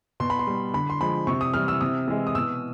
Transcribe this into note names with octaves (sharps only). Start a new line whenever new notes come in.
B2 C6
B5
C6
G3
D3 B5
C6
F3 G#3 B5
C3 C#6
D#6
E3 G3 F6
E6
C3 D#6
E3 G#3
D#6
B2 E6